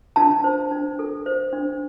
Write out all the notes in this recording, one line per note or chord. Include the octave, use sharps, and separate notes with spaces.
D4 A5
C5
D4
A4
C5
D4